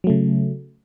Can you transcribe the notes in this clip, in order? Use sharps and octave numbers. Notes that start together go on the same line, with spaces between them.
C#3 F#3 A3